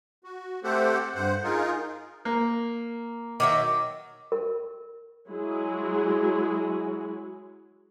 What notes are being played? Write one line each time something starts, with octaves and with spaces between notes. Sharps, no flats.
F#4
A3 C4 G4 A4 C5 F#5
G2 C5 F#5
D#4 F4 G#4 A#4
A#3
D#3 F#3 E5 D6
A#4
F#3 G#3 E4 F#4 G#4